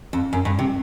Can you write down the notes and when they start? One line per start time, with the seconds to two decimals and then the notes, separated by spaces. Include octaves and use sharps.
0.13 F2
0.33 F#2
0.45 G2
0.59 C3